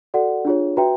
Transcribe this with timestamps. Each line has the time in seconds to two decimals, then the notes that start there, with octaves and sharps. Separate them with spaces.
0.14 F#4 A4 D5 F#5
0.45 D4 F4 G#4 C#5
0.77 F#4 B4 E5 G5 A#5